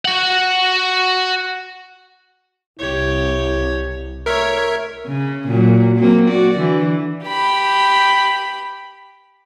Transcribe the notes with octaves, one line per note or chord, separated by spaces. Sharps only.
F#4 F#5
C2 E4 G4 C#5
A2 A#4 C#5 E5
C#3
A#2 F#3
F#3 A#3 C4
F#4 D5
D3 E3
G4 B5